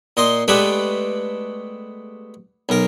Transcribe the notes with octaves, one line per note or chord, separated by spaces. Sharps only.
A#2 D#5 C6
G#3 A3 B3 D4 G4 B4
B1 A#4